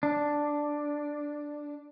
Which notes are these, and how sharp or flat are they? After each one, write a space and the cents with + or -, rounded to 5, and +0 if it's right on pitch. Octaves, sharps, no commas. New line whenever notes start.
D4 +0